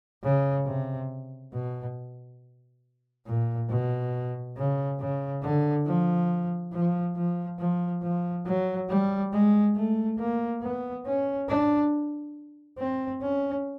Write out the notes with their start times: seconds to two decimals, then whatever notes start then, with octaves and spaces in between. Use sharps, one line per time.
0.23 C#3
0.66 C3
1.53 B2
3.26 A#2
3.69 B2
4.56 C#3
4.99 C#3
5.42 D3
5.86 F3
6.73 F3
7.16 F3
7.59 F3
8.02 F3
8.45 F#3
8.89 G3
9.32 G#3
9.75 A3
10.18 A#3
10.62 B3
11.05 C#4
11.48 D4
12.78 C4
13.22 C#4